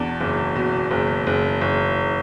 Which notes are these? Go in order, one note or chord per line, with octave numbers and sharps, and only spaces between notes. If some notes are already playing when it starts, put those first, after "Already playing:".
Already playing: E2 B2 D4
F#1
B2
F#1
F#1
F#1